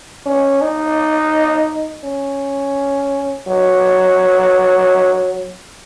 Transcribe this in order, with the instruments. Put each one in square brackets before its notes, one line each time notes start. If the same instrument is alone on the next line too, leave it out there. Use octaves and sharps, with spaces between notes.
[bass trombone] C#4
D#4
C#4
F#3